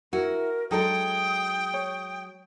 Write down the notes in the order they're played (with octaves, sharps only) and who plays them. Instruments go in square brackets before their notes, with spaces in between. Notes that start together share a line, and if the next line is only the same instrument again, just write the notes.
[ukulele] E4 [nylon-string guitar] F#4 [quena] A#4
[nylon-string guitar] F#3 G#3 [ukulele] D4 D#4 A4 [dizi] G5 [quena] D#6
[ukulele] C#5